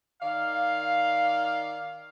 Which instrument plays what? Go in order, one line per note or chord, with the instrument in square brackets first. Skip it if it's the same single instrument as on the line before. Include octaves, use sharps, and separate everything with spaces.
[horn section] D#3 D5 F5